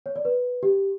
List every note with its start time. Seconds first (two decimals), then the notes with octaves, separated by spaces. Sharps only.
0.06 C#5
0.16 D5
0.25 B4
0.63 G4